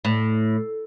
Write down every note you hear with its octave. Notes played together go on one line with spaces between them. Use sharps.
A2